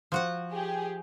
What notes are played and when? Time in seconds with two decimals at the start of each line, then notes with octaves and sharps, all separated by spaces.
0.12 F3 F#4 F#5
0.52 G4 G#4